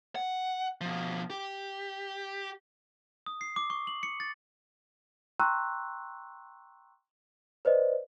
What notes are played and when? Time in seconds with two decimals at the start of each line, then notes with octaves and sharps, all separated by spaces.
0.15 F#5
0.81 B2 F3
1.30 G4
3.26 D#6
3.41 C7
3.56 D6
3.70 C#6
3.87 F#7
4.03 C#7
4.20 A6
5.40 G5 A#5 C6 C#6 E6 F#6
7.65 B4 C5 D5 D#5